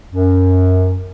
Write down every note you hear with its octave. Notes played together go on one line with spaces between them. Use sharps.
F#2